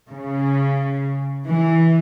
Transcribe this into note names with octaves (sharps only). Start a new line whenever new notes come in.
C#3
E3